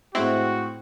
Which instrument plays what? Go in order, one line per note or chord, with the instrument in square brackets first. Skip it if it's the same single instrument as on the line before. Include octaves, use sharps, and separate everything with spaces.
[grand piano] A2 G#3 [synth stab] C4 E4 [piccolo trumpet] F#4